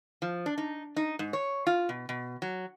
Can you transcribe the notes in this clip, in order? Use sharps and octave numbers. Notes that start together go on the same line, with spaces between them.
F3
D4
D#4
D#4
G#2
C#5
F4
B2
B2
F#3